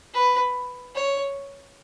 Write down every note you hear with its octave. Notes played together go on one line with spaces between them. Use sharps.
B4
C#5